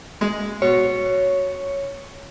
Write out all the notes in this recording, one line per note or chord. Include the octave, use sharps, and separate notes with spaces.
G#3
B2 C#5